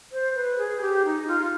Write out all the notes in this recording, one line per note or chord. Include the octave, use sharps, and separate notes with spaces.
C5
B4
G#4
G4
D#4
F4